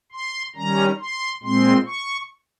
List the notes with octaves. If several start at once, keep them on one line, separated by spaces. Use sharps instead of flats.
C6
D#3 G3 C#4 A#5
C6
A#2 G#3 C4 C6
C#6